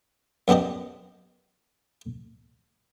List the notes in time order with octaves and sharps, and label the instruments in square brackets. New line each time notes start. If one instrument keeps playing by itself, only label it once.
[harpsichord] F#2 B3 D4 G4 D#5